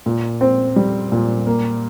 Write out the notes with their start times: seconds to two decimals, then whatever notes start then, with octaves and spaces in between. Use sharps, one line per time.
0.06 A#2
0.41 C4
0.76 G3
1.12 A#2
1.47 A#3